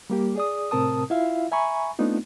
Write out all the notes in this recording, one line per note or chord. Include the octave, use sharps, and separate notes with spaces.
G3 A#3 G4
G#4 D5 D#6
A2 C3 C4 A#4 A5 D#6
E4 F4 E5 F5
E5 G#5 A#5 B5 C#6
A3 B3 C4 D4 D#4 F4